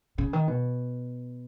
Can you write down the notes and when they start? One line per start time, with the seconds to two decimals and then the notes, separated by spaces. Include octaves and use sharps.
0.18 C#3
0.33 D#3
0.48 B2